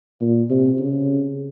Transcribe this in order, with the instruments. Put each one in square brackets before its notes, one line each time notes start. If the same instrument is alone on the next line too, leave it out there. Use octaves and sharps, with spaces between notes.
[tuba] A#2
C3
C#3